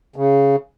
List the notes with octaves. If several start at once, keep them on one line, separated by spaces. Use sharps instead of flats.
C#3